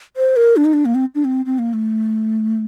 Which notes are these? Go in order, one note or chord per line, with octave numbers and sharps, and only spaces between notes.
C5
A#4
D4
D#4
D4
A#3
C4
D4
C4
C4
A#3
A3